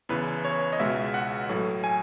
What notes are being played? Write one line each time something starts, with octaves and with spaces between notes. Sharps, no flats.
E2 C#3 E3 B4
C#5
D#5
C#2 B2 G#3 E5
F#5
A2 F#3 A3
G#5